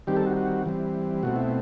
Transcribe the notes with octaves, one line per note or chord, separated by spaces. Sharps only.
D#3 G3 C4 G4
A4
F#4
F#4
E3 G3 C4
B2 A3 C4 F#4
E4